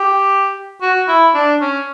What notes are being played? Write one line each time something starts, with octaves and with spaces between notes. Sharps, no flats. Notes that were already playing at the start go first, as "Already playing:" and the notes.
Already playing: G4
F#4
E4
D4
C#4